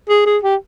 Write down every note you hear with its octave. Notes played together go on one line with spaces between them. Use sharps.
G#4
G#4
G4